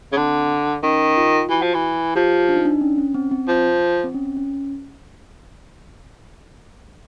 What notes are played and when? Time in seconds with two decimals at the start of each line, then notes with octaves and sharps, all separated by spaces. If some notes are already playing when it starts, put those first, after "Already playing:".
0.12 C#3
0.16 D3 C4
0.83 D#3 C#4
1.17 F4
1.49 E3 F#4
1.62 F3
1.74 E3
2.16 F3 G4
2.49 D4
2.57 D#4
2.65 D4
2.81 C#4
2.98 C#4
3.14 C4
3.31 C4
3.48 F3
4.04 C4
4.14 C#4
4.37 C#4